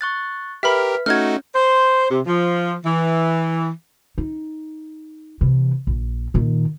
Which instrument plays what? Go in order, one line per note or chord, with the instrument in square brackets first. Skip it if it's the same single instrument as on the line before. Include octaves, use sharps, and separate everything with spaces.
[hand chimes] C#6 F#6 A6
[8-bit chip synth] G4 A#4 [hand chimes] B4 F6 B6 [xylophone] E5 B5
[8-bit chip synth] A3 D#4 F#4 [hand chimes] C#4 [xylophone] F6 G#6
[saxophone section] C5
C3
F3
E3
[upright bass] D#4
C3 E3
A#1
A#2 D#3